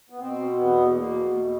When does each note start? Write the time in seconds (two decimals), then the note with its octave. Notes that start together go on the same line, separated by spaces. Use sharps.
0.10 B3
0.19 B2 C4
0.57 E2 B3
0.95 B2 A#3
1.32 E2 A#3
1.39 A3